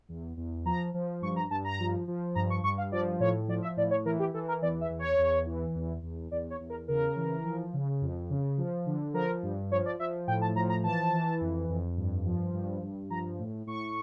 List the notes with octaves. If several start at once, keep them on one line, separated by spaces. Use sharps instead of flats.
E2
E2
F3 A#5
F3
G2 C#6
A#5
G2 A5
A#5
F3
F3
G2 A#5
C#6
G2 C#6
F5
F3 D5
A2 C#5
F3 D5
E5
A2 D5
C#5
E3 A#4
G4
E3 A4
A#4
E2 D5
E5
E2
C#5
E2
E3
E2
E2
E2 D5
C#5
E2
A#4
C#3 A#4
E3
F3
C#3
F2
C#3
F3
D3
F3 A#4
G2
F3 C#5
D5
F3 E5
A2 G5
A5
F3 A#5
A#5
E3 A5
E3
F2
F2
G2
F3
G2
G2
F3 A#5
A2
A2 C#6